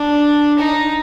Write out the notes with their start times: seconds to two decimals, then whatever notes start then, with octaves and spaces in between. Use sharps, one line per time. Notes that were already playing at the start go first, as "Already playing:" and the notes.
Already playing: D4
0.59 D#4